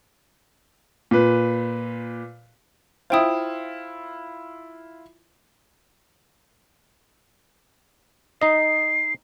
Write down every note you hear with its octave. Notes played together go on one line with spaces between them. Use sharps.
A#2 B4
E4 F4 C5 G5 D#6
D#4 D#5 C7